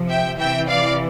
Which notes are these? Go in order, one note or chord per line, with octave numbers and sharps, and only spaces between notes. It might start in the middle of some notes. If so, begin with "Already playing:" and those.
Already playing: C3 F3
E5 G5
C3 E3 E5 G5
D5 F5